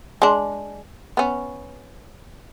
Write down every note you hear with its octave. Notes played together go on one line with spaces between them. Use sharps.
G#3 D4
B3 C#4